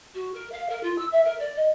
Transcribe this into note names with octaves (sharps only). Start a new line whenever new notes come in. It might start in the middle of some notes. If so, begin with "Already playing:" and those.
F#4
A#4
F5
A#4
F4
E6
E5
A#4
D5
D#5